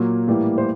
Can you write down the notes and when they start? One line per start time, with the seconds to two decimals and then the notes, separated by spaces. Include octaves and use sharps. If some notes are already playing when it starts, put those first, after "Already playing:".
Already playing: A#2 F#3 A#3
0.27 A2 E3 G3 A#3
0.58 C5